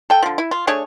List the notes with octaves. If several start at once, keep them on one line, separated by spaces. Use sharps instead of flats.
A4 G5
D3 F3
E4
F4
A3 D4 G#4 C#5